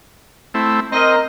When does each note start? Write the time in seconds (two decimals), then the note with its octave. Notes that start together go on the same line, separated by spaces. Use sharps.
0.54 A3 C4 E4
0.92 C4 A#4 D#5